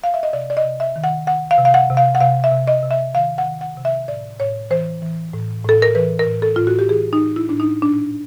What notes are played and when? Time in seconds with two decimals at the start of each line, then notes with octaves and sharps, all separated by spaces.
0.04 F5
0.14 E5
0.23 D#5
0.33 C3 D5
0.50 D5
0.57 D#5
0.64 C3
0.80 E5
0.96 D#3
1.04 F#5
1.27 D#3 F#5
1.51 F5
1.58 C3
1.65 F5
1.74 F#5
1.90 C3
1.97 F5
2.15 F#5
2.21 C3 F5
2.44 E5
2.52 C3
2.68 D#5
2.83 C3
2.91 E5
3.14 D#3 F5
3.38 F#5
3.46 D#3
3.61 F#5
3.77 C3
3.85 E5
4.08 A2 D5
4.40 A2 C#5
4.70 E3 C5
5.02 E3
5.33 A2
5.64 A2 A4
5.82 A#4
5.95 E3 B4
6.19 A#4
6.27 A2
6.42 A4
6.56 A2 F4
6.67 F#4
6.79 G4
6.89 E3 G#4
7.13 D#4
7.21 A2
7.36 E4
7.49 A2 D4
7.60 D#4
7.82 A#2 D4